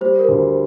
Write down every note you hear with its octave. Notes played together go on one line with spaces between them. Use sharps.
G3 C5
A#4
D2